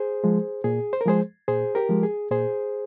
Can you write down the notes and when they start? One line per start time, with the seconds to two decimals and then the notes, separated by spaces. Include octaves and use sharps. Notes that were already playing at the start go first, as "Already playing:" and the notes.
Already playing: G#4 C5
0.24 F3 G#3
0.64 A#2 G#4
0.93 C5
1.01 A#4
1.06 F3 G#3 G#4 C5
1.48 A#2 G#4 C5
1.75 G4 A#4
1.89 F3 G#3
2.03 G#4
2.30 A#2 G#4 C5